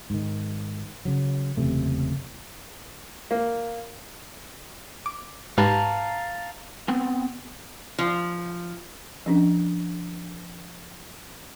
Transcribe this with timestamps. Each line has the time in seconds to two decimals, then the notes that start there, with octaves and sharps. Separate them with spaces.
0.10 G#2 D#3
1.05 C#3 F#3
1.57 F#1 E2 C3 A3
3.31 A#3
5.06 D6
5.58 G#2 G4 B4 F5 A5 A#5
6.88 B3 C4
7.99 F3
9.26 F3 C#4 D4